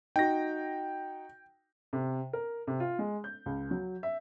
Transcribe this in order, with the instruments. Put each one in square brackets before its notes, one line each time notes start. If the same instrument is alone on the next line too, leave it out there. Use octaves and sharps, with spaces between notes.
[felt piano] D#4 F#4 [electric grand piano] G5 A#6
[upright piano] C3
A#4
C3
F4
G#3
G6
C#2
F#3
E5